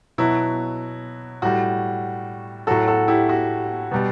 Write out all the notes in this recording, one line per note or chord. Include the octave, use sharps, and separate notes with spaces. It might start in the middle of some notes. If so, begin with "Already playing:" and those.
B2 F#3 E4
A2 G3 F#4
A2 F#3 F#4 A4
F#4 A4
E4 G4
F#4
B2 G3